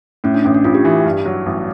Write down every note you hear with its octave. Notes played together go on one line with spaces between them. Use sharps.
A2 C#4
D4
A1 C#4
D4
A1 F4
G4
E3 G4
G2
F#3
A1